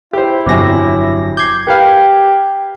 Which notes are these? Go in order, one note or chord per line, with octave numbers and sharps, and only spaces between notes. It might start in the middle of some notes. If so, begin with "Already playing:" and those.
E4 G4 C5
G1 F2 C3 F#3 G#5 D6 A#6
D6 G6 G#6 C7
G4 A#4 B4 F5 G5